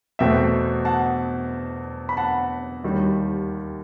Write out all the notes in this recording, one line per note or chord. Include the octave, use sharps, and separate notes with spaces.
E2 B2 A3 C4 E5 G5
F#5 A5
B5
F#5 A5
D#2 D#3 G3